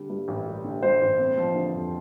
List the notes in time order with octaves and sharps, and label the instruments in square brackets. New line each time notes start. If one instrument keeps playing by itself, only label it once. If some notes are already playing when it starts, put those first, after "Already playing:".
Already playing: [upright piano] D3 G3
G2
A1
G3
D3
[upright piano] G2 [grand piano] C5
[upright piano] A1
C4
F3
D3
F2